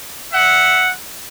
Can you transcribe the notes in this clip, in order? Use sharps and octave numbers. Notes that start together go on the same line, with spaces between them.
E5 F#5